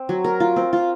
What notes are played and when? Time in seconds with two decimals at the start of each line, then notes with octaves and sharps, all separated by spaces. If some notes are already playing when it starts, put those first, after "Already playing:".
Already playing: C4
0.09 F#3
0.24 A#4
0.40 F4
0.56 C4
0.73 F4